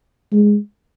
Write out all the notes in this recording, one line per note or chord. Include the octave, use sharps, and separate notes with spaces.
G#3